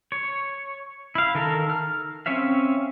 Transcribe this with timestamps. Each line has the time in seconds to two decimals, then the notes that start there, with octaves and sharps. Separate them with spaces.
0.12 C#5
1.15 E4 F5
1.35 D#3 A4 A#4
1.70 F6
2.26 C4 C#4 C#5 E5 F5